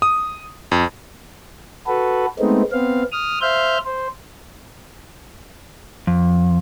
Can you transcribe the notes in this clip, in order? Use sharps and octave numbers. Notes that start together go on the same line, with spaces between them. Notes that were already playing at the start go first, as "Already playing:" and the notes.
D#6
F2
F#4 A4 B4
G#3 A3 B3 C4 D#4
B3 C4 F5
D#6 F6
C5 E5 F5 F6 G6
C5
F2